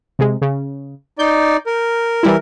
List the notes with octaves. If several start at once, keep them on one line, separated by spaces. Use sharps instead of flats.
C3 G#3
C#3
D#4 D5 G6
A#4
E3 G3 E4